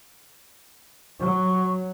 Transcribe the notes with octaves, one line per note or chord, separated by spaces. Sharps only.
F#3 C#6